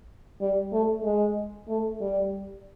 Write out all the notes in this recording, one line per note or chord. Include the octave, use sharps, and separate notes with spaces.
G3
A3
G#3
A3
G3